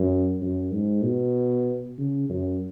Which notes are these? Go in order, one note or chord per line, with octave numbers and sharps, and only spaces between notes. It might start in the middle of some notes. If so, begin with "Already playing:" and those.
Already playing: F#2
F#2
G#2
B2
C#3
F#2